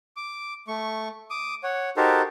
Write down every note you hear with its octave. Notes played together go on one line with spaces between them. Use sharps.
D6
A3 C#6
D6 D#6
C#5 F#5
D#4 F#4 G4 A4 A#4 C5